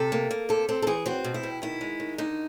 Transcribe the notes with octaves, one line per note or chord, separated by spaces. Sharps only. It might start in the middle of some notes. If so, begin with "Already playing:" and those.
Already playing: C3 A4
A#3
A#3
C3 A4
C4 A4
A4
E3 G#4
C4 F#4
B2
E4
B2
D#3 E4
G#3
D#3
D3 D#4